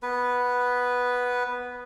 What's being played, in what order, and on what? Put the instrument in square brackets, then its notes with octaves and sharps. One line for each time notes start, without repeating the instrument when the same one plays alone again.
[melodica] B3 B4